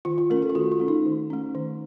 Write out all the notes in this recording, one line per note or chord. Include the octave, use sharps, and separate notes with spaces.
D#3 F4
F4
A3 C#4 A#4
A4
F4
D#3 F#4
F4
A3 C#4
D#4
D#3
A3 C#4
D#3